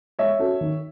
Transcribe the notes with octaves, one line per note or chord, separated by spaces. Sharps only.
G#3 C#5 E5
C#4 F#4 A4
D#3